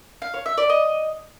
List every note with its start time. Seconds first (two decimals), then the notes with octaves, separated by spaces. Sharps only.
0.22 F5
0.34 C#5
0.46 E5
0.58 D5
0.70 D#5